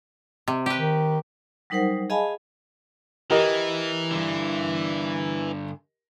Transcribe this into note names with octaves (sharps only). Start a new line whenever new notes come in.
C3
G4 B4
D#3
F#3 G3 D#4 A#4 C5 F#5
G#4 D#5 F5 G#5 A5 B5
E3 G4 A#4 D#5
G2 D3